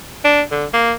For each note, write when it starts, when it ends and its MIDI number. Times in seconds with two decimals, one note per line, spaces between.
0.24 0.41 62
0.51 0.65 50
0.73 0.93 58